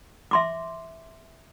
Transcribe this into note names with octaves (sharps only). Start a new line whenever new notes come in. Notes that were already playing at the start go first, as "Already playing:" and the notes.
E5 C6 D6